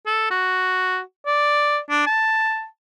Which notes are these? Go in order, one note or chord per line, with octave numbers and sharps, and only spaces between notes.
A4
F#4
D5
D4
A5